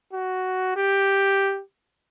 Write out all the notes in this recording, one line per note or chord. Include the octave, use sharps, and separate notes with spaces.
F#4
G4